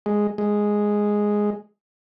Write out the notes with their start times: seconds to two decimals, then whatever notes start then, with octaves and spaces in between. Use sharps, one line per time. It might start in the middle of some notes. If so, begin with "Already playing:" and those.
0.06 G#3
0.38 G#3